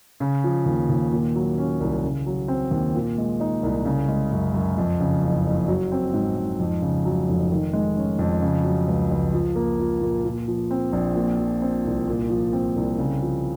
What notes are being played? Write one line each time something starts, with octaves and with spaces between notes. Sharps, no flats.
C#3
F3
D#2
D#2
A#2
F#3
C#4
C2
C#3
F#3
C4
D#2
A#2
G#3
D#4
C2
C#3
G#3
F#2
F#2
F2
C#3
F#1
F#1
F#3
C4
G#2
G#2
F2
C#3
F#3
F1
D#3
G#3
C#4
F2
C#3
F#3
C#2
C#2
F3
A#3
F4
A#2
A#2
F3
C4
A#1
A#2
F3
C4
C2
A#2
F3
C4
C2
C#3
F3